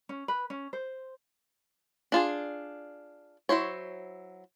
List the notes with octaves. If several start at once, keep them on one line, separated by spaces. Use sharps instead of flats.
C#4
B4
C#4
C5
D4 F4 G#4
F#3 E4 C5 C#5